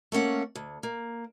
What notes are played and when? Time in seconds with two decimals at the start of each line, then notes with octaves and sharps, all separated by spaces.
0.12 A3 A#3 C#4 F#5
0.55 D2
0.83 A#3